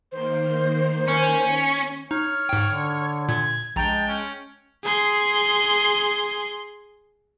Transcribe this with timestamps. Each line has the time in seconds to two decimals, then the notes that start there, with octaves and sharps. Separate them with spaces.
0.12 D#3 A#3 C5
1.08 C#4
2.11 D#4 C#5 F6
2.49 G#2 G5
2.66 D3
3.29 A#2 G#6
3.76 A#1 G#3 G5 A5 A#5
4.08 C#4
4.84 G#4 C6